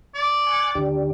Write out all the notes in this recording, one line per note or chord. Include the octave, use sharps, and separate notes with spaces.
D5
G#5 C#6 F#6
D2 D4 G4